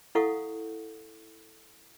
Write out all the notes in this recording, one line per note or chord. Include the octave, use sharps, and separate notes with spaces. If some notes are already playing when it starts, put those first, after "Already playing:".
E4 A4 F5 F#5 C#6 D#6